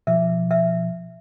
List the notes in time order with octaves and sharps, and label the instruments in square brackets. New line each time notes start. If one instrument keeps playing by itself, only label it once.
[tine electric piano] B2 F3 [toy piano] E5
[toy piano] E5